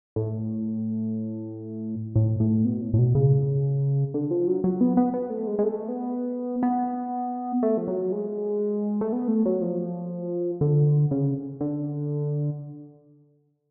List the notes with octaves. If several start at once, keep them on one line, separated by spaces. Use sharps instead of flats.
A2
A2
A2
B2
A2
A2
B2
C#3
D3
F3
F#3
F#3
B3
B3
B3
A3
G#3
G#3
A3
B3
B3
A3
F3
F#3
G#3
A3
B3
A3
F#3
F3
D3
C#3
D3